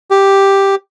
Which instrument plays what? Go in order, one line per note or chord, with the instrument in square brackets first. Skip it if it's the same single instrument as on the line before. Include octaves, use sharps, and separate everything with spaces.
[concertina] G4